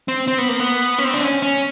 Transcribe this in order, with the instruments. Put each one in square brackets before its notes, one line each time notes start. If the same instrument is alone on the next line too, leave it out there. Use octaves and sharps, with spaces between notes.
[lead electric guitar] C4
C4
B3
A#3
B3
C#4
C4
D4
C#4
C#4